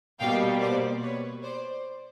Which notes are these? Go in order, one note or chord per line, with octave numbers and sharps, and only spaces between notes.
B2 G3 A#3 F5 G5
C5 D5
B4 C#5
C5 D5